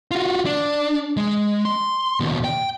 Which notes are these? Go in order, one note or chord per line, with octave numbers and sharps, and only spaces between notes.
F4 F#4
D4
G#3
C6
D#2 B2
G5